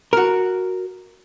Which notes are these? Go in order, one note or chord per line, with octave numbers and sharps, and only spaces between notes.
F#4 A#4